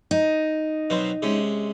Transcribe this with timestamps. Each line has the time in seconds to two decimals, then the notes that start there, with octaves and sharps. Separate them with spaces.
0.11 D#4
0.90 B2 F#3 C4
1.22 C3 G#3 C#4